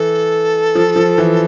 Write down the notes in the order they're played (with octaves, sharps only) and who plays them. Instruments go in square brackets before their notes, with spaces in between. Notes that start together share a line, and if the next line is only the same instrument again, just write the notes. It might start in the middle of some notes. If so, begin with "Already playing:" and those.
Already playing: [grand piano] E3 [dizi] A4
[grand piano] F3
F3
E3